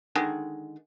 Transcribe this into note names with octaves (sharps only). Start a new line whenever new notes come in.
D3 D#3 G#3